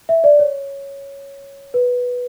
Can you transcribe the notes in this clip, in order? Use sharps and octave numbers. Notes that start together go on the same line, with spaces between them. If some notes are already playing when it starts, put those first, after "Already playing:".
E5
D5
C#5
B4